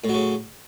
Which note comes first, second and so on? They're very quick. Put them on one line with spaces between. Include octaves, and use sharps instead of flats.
A2 F#3 C#3